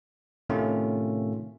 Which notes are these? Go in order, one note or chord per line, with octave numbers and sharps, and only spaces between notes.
A2 C3 D#3 A3 C#4 F4